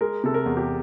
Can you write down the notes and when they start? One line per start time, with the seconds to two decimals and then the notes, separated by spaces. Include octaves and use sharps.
0.01 G#3 A#4
0.24 C3 A4
0.34 A#4
0.46 E2
0.57 G4